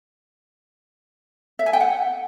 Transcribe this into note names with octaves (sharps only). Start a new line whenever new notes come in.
E5
G#5
G5
F#5